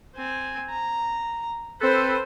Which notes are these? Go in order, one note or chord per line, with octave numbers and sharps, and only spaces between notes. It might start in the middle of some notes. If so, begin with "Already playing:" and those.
C4 G#5
A#5
C4 A4 B4 C5